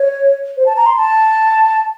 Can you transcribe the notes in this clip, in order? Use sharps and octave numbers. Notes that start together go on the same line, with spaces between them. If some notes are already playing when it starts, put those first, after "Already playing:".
Already playing: C#5
C5
A5
A#5
C6
A5